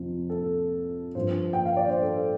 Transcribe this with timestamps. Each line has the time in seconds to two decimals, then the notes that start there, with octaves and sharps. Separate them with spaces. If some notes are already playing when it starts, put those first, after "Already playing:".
Already playing: F2 C3 F3
0.30 A4
1.15 G2 F3 C5
1.53 G5
1.65 F5
1.77 D5
1.89 C5
2.02 A4